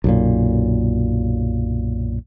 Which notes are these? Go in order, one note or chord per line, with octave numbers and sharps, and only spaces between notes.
B1 F#2 A#2